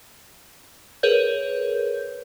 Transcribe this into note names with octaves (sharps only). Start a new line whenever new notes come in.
G#4 A#4 B4 C#5 G6